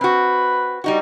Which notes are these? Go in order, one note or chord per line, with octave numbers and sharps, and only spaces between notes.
C4 F#4 B4
G3 D#4 F#4